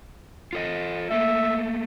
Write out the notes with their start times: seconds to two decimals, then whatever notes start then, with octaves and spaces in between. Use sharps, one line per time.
0.53 F4 A4 D#5
1.11 A3 A#3 E5